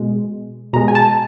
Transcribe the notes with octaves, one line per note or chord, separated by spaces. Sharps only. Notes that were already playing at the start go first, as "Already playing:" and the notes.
Already playing: B2 G#3
B2 G#3 A#5
G#5
A5